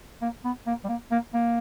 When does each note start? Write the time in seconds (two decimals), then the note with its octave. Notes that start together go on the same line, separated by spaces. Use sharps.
0.22 A#3
0.44 B3
0.66 A#3
0.84 G3
0.88 A#3
1.11 A#3
1.34 A#3